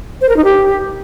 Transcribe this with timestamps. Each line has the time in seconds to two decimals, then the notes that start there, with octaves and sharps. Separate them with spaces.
0.21 C5
0.29 A#4
0.37 D#4
0.44 G4